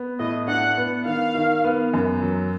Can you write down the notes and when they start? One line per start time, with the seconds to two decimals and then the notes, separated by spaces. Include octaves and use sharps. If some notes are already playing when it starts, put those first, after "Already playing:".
Already playing: B3
0.19 A2 D#5
0.48 D4 F#5
0.77 B3
1.06 D#3 F5
1.35 D#3
1.64 B3
1.93 F#2
2.22 F#3